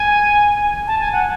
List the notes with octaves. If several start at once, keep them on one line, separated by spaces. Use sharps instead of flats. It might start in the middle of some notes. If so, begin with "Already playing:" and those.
Already playing: G#5
A5
G#5
F#5